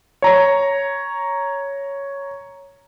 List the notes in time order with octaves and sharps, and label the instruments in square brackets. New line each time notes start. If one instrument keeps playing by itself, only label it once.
[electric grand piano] C#5 A#5